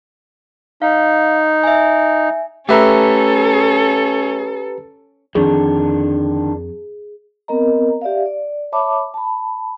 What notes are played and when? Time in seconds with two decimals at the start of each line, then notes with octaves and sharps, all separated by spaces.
0.82 D#4 F5
1.64 E5 G#5
2.69 A3 C#4 G4 A4 B4 E5 A#5
5.35 F2 D3 D#3 D4 G#4
7.48 B3 C4 A#4 D#5 A#5
8.01 G4 D5 E5 F5
8.26 D5
8.72 C#5 E5 A5 B5 D6
9.14 A5 B5